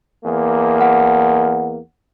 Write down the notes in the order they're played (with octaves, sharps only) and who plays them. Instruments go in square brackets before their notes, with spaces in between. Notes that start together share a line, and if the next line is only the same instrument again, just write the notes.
[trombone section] E2 A#3
[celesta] F#5